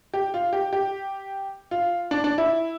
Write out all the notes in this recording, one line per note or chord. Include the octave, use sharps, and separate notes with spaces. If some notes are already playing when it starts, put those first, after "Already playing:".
G4
F4
G4
G4
F4
D4
D4
E4